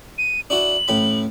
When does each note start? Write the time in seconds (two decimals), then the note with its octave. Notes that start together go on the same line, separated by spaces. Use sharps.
0.18 D#7
0.50 D4 E4 F#4 F#7
0.88 A1 A2 B5